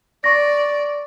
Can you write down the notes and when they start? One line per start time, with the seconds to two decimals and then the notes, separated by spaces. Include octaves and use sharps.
0.24 D5 C#6 A#6